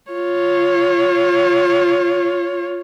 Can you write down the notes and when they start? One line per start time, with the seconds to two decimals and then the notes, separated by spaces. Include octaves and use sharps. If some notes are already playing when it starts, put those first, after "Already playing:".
0.11 F4 C#5